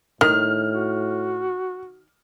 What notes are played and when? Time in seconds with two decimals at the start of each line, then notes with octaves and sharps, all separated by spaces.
0.21 A2 D#3 F6
0.73 F#4